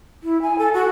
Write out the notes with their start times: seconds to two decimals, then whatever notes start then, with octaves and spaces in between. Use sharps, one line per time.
0.23 E4
0.42 G#5
0.58 A4
0.74 F#4